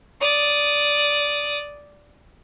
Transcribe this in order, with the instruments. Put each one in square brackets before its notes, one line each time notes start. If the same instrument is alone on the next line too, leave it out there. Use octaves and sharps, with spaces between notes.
[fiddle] D5 D#6